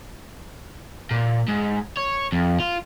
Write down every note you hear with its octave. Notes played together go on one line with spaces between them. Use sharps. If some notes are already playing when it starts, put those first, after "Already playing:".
A#2
G#2
C#5
F2
F4